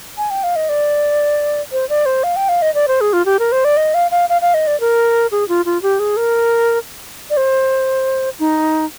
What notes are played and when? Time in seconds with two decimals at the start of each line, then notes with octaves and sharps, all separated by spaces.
0.18 G#5
0.30 G5
0.43 F5
0.56 D#5
0.69 D5
1.72 C5
1.89 D5
2.06 C5
2.24 F5
2.36 G5
2.49 F5
2.62 D#5
2.74 D5
2.88 C5
3.01 G#4
3.13 F4
3.26 G4
3.39 A#4
3.52 C5
3.65 D5
3.77 D#5
3.94 F5
4.11 F5
4.29 F5
4.42 F5
4.54 D#5
4.67 D5
4.80 A#4
5.32 G#4
5.48 F4
5.66 F4
5.82 G4
5.99 G#4
6.17 A#4
7.30 D5
7.37 C5
8.39 D#4